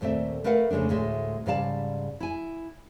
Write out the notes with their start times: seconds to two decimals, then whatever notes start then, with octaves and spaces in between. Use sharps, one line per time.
0.01 D#2 A#2 A3 C4 E5
0.44 A3 A#4 B4 F5 F#5
0.71 F2 C#3 G#3 A3 D4
0.89 D2 A2 G#3 E5
1.46 G#2 C#3 G3 D5 F5 A5
2.20 E4 G#5